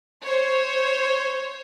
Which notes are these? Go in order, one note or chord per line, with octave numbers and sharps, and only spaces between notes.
C5 C#5